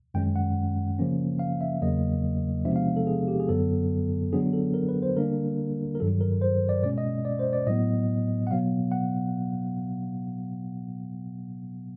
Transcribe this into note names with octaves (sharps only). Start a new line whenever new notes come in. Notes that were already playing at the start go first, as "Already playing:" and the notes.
F#2 D#3 G#3 C#4 G5
F#5
C#3 F3 A#3 C#4
F5
E5
E2 C#3 F#3 A#3 D#5
C3 F3 G#3 B3 D4 E5
F5
A4
G#4
G4
G#4
F#2 D3 F#3 B3 A4
D3 F#3 B3 D4 G#4
A4
A#4
B4
C5
D3 G3 A#3 D4 A#4
A#4
G2 D#3 F#3 A4
A#4
C5
D5
B2 G#3 C#4 D5
D#5
D5
C5
D5
A2 F#3 B3 D#5
F#5
B2 F#3 B3 F5
F#5